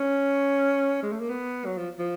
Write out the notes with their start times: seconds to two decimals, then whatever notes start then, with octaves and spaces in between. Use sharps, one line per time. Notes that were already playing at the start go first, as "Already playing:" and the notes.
Already playing: C#4
1.03 G#3
1.12 A3
1.20 A#3
1.30 B3
1.66 F#3
1.78 F3
1.99 F3